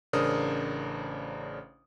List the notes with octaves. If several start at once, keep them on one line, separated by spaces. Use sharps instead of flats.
A1 C#3 D4 A#4 C5 D#6